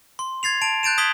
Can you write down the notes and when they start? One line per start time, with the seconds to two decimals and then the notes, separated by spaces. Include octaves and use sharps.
0.19 C6
0.43 G#6 A6 C7 F7
0.61 A5 D7 F7
0.83 F#6 G6 A6 D7 E7
0.98 D#6 G#6 B6 F#7 G7